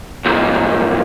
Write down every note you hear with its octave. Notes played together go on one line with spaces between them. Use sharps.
C2 G#2